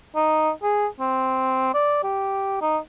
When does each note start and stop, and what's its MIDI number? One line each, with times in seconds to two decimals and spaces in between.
0.16 0.50 63
0.63 0.87 68
1.00 1.70 60
1.74 2.00 74
2.04 2.61 67
2.62 2.78 63